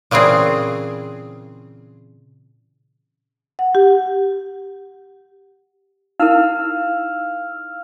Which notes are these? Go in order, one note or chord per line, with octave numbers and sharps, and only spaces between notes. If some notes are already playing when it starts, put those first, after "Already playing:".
A#2 C#3 E3 C4 G#4
F#5
G4
D#4 E4 A#4 F5 E6 F6